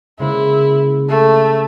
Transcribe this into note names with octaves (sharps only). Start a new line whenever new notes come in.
C#3 G#3 A#3 E4
A3